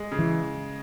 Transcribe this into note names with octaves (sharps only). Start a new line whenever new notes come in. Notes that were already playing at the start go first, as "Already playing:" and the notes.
Already playing: G#3
C#3
E3